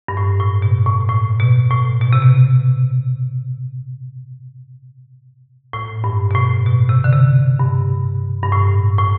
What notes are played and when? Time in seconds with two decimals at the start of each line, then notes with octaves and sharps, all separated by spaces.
0.08 G2
0.17 A2
0.40 A2
0.62 B2
0.86 A2
1.09 A2
1.40 B2
1.71 A2
2.02 B2
2.13 C3
2.22 B2
5.73 A2
6.04 G2
6.31 B2
6.35 A2
6.67 B2
6.89 C3
7.04 D3
7.13 C3
7.59 G2
8.43 G2
8.52 A2
8.98 A2